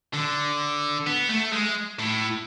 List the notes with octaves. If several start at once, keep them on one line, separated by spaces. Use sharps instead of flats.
D3
B3
A3
G#3
A2